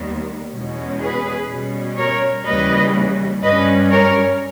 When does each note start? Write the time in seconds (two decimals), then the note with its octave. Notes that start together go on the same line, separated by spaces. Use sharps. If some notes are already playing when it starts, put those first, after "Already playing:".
Already playing: D#2 D#3 G3 B3
0.53 E2 B2 G#3 C#4
1.01 G#4 B4
1.49 B2 G3 C#4
1.98 A#4 C#5
2.46 D#2 C#3 E3 G3 C#4 B4 D#5
3.43 G2 G3 C#4 B4 D#5
3.91 A#4 C#5